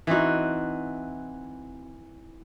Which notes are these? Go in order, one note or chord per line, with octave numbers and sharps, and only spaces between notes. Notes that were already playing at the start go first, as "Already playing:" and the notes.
E3 C4 D#4 F#4